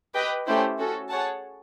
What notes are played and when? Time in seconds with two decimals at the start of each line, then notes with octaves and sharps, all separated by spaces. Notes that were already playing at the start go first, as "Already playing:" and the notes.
0.15 G4 B4 D#5 G5
0.47 A3 C#4 E4 G4 C5
0.79 C#4 F#4 A4
1.09 G#4 C#5 F#5 A5